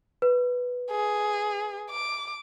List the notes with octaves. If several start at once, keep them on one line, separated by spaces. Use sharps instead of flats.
B4
G#4
D6